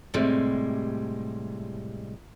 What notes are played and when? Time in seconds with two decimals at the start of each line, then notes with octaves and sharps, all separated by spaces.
0.14 A2 C3 G3 G#3